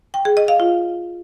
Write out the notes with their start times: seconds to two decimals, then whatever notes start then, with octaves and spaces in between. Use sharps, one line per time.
0.14 G5
0.25 G#4
0.37 D#5
0.48 F5
0.60 F4